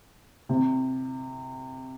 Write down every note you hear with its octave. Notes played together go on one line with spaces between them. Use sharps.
C3